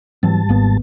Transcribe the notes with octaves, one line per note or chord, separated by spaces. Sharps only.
G#2 E3 F#3 G3 C4 A5
G#1 A#3 B3